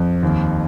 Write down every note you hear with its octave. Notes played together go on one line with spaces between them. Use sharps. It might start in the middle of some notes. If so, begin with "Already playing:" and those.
Already playing: F2
D#2